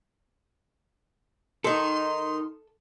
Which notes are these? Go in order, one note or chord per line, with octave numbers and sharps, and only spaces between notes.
D#3 D#4 A4 C6